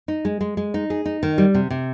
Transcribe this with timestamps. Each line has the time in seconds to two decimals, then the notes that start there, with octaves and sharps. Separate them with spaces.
0.08 D#4
0.25 G#3
0.41 G#3
0.57 G#3
0.74 D#4
0.90 G#4
1.05 D#4
1.23 D#3
1.38 G3
1.54 C3
1.70 C3